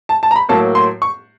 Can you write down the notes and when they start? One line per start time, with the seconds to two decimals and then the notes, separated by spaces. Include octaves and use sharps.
0.09 A5
0.23 A5
0.31 A#5
0.36 B5
0.49 A2 F#3 A#3 A5
0.75 C6
1.02 C#6